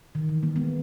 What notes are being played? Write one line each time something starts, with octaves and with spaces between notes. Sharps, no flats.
D#3
E3
G3 A#3
G#3 B3